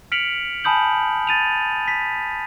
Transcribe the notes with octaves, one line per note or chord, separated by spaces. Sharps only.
F6 B6 C#7 D7 F7 F#7
G#5 A5 B5 D#6 G6 F#7
A6 D#7 F7
B6